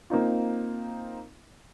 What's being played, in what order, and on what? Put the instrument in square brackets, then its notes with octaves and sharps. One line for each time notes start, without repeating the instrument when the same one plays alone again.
[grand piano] A#3 C4 D#4 F4